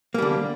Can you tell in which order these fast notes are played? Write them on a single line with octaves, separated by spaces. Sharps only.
A#3 G3 D3